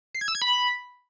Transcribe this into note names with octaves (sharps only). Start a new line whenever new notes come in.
C7
G#6
E6
G#6
B5